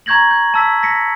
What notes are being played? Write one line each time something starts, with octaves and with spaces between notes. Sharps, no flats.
A#5 C#6 G6 G#6 A#6 F#7
G6
A5 E6 B6
A#6 B6 C#7